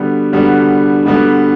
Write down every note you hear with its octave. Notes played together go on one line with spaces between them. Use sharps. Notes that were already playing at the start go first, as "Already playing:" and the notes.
Already playing: D3 G3 B3 F#4
D3 G3 B3 F#4
D3 G3 B3 F#4